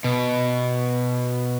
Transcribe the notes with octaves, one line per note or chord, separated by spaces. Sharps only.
B2